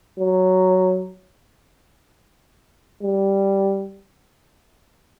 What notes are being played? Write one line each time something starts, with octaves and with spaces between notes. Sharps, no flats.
F#3
G3